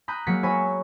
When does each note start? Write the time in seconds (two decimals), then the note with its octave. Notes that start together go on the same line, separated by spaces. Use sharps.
0.08 A#5 B5 D#6 F#6 G6
0.26 F#3 G#3 A#3 A6 B6 C#7
0.43 C#5 E5 G#5 A#5 B5